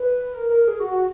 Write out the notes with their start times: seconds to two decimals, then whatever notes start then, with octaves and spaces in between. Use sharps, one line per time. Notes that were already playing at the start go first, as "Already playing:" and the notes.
Already playing: B4
0.34 A#4
0.50 A#4
0.68 G#4
0.80 F#4
0.91 F#4